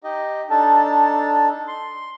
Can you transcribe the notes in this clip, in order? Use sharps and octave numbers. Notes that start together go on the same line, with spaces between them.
D#4 G4 D#5
D4 D#4 A4 A5
C6